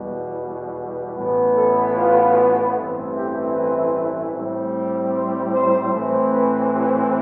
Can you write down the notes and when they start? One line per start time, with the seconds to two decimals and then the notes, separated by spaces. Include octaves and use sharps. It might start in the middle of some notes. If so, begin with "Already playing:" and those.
Already playing: E2 B2 G3
1.16 A1 A2 E3 B3
1.56 A4
1.95 F4
2.75 A1 G2 E3 A3 C4
3.15 G4
3.55 B4
4.34 A2 G3 C4
5.13 C5
5.53 C5
5.93 A2 E3 A3 C4
6.33 B4
6.73 G4